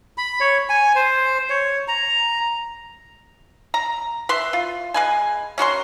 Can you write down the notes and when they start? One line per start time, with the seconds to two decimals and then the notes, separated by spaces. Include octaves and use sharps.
0.18 B5
0.40 C#5
0.69 G#5
0.95 C5
1.50 C#5
1.88 A#5
3.74 A#5
4.29 B4 E5 C6
4.53 F4
4.94 G#3 B4 G#5
5.58 C#4 F#4 A#4 C6